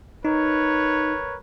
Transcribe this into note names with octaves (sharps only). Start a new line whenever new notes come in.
D#4 A#4 B4 C#5